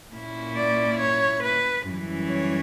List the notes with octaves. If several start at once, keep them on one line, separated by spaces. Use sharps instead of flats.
A#2 A#3 C#4 E4
D5
C#5
B4
F#2 E3 G3 C#4 E4
C#5